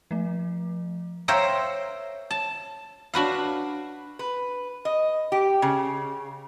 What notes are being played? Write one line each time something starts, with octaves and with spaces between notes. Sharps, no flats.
F3 A3
A#4 C5 C#5 E5 F5 G5
A5
D4 F#4 B4 F5
B4
D#5
G4
C#3